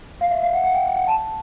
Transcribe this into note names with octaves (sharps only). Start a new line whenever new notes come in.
F5
E5
F5
F#5
F#5
G5
G5
F#5
A5